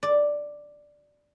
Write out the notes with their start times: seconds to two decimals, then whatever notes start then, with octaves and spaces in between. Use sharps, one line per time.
0.03 D5